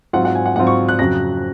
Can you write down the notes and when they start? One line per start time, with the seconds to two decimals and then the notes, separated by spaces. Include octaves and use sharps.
0.13 G#2 F#3 C4 F4 F#5
0.25 F#5
0.35 G#5
0.46 F#5
0.56 G#2 F#3 C4 F4 F#5
0.67 C#6
0.89 F#6
0.99 F2 C#3 F#3 A#6